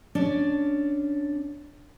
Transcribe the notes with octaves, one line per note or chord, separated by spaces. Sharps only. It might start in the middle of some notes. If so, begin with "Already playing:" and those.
C#4 D4 D5